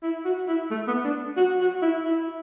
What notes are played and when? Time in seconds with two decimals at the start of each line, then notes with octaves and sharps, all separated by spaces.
0.03 E4
0.25 F#4
0.48 E4
0.71 A3
0.87 B3
1.04 D4
1.37 F#4
1.60 F#4
1.82 E4
2.05 E4